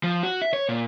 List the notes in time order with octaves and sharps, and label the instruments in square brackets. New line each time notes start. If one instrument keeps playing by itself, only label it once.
[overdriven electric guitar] F3
F#4
E5
C#5
A#2